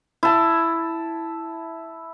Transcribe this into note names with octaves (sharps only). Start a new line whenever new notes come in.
E4 A5